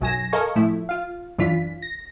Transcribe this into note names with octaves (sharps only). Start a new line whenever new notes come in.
B1 F#2 F#3 G#5 A#6 E7
A4 A#4 D#5 F5 G#5 C#6
A2 F3 A3 E4
F4 F5
F#2 E3 D4 F4 B6
A#6